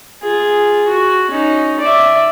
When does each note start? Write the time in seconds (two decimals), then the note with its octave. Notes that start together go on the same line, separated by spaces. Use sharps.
0.24 F4 G#4
0.87 F#4
1.31 C#4 D#4
1.80 D5 E5